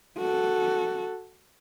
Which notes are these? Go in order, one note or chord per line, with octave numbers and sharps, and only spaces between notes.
F#4 A4